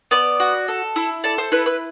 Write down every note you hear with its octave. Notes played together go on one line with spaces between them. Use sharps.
B3 D5
F#4
A4
E4
A4 D5
C5
E4 B4
B4